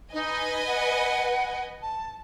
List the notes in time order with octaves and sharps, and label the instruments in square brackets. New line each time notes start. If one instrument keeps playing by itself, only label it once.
[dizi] D#4 [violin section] B4 D#5 G#5
[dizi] F#5
A5